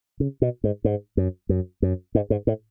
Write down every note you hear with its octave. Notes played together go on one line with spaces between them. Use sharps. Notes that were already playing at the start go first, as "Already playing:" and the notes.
C#3
B2
G#2
G#2
F#2
F#2
F#2
G#2
G#2
A2